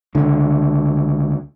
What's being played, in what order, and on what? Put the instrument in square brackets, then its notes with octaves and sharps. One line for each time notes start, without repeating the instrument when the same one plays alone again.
[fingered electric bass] C#2 D3